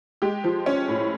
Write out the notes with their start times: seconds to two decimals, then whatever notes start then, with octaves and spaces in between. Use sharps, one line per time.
0.22 G#3 G4
0.44 F3
0.66 C#4
0.88 A2